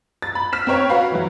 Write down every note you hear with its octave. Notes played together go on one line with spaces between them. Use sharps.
A6
B5
F6 B6 E7
C4 C#4 B4 C#5 G5
F#4 B4 F5
E3 F#3